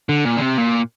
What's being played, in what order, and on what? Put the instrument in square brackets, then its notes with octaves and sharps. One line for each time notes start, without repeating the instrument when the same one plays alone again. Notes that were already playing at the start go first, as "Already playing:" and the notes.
[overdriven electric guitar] D3
A#2
D3
C3
A#2